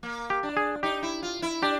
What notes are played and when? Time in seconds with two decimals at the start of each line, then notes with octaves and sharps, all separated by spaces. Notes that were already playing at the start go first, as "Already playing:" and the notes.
0.03 A#3
0.30 G4
0.43 D4
0.57 G#4
0.83 D#4 G4
1.03 E4
1.23 F4
1.42 E4
1.62 D4 G4